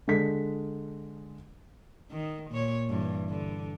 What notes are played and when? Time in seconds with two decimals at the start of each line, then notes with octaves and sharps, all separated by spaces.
0.07 D3 G#3 A4 B6
2.11 D#3
2.51 A#2 C#5
2.87 G2 E3
3.30 D3